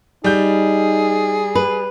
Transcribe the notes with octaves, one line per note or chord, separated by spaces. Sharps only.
G3 D#4 G#4 G6
B4